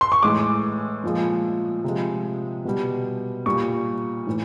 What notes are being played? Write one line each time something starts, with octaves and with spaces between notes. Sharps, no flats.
C6
C#6
A2 E3 G#3 D6
A#2 F3 G#3
C3 F3 G#3
B2 G3
A#2 G3 C#6
A2 E3